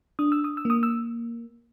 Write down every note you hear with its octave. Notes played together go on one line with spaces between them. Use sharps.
D4 D#6
E6
D#6
E6
A#3 D#6
E6